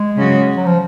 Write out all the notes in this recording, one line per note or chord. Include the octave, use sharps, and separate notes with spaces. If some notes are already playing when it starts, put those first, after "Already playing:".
Already playing: G#3
C#3 F#3 C#4 F#4
F#3
F3